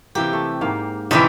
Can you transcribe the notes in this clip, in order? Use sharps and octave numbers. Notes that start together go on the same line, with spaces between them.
C3 E3 A#3 G4
A3
G#2 A#3 F5
A2 C3 D#3 E3 C#4 D#4 G4 D5